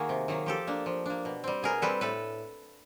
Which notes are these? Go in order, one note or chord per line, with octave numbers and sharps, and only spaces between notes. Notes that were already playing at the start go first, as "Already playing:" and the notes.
Already playing: D#3 A#3 F#4 G#4
C3
D#3 F#3 A#3
F3 G4 A4
A#3 D4
F3
A#3 D4
B2
G3 C4
B2 G#4 A#4
G3 C4 A4 B4
A2 A4 B4